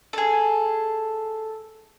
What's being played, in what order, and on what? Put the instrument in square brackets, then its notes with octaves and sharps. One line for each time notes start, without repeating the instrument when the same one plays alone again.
[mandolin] G#4 A4